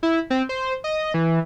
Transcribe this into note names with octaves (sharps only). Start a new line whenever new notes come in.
E4
C4
C5
D#5
E3